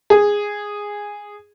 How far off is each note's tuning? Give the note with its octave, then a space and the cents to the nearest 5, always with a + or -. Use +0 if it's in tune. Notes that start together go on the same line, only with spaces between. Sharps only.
G#4 -10